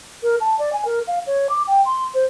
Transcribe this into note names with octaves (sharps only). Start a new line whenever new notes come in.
A#4
A5
D5
G#5
A#4
F5
C#5
D6
G5
C6
C5